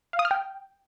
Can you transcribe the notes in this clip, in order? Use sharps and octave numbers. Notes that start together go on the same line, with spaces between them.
F5
D#6
F6
G5